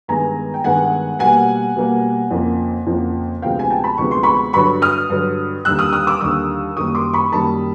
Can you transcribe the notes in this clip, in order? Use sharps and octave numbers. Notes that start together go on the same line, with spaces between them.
G2 D#3 G#3 B3 G#5 A#5
G5
G2 D#3 G#3 B3 F#5 G#5
B2 G3 A#3 F#5 G#5
B2 G3 A#3
F2 C#3 F3 A#3
F2 C#3 F3 A#3
D2 C3 F3 G#3 B3 F5 G5
G#5
G5 A5
A5 B5
D2 C3 F3 G#3 B3 C#6
C6
B5 C#6
G2 D3 F#3 B5 C#6
D#6 F6
G2 D3 F#3
D#2 D3 G3 E6 F#6
D#6 F6
D#6 F6
D6 E6
D#2 D3 G3 C#6 D#6
F#2 D#3 G3 A#3 C#6 D#6
C6 D6
B5 C#6
F#2 D#3 G3 A#3 A5 B5